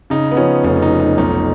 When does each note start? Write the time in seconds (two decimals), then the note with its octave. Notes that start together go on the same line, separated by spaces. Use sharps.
0.10 C#3 D#4
0.32 B3
0.37 F3 C#4
0.64 F1 C#4
0.82 D#4
0.90 F3
1.00 D#4
1.18 B1 D#4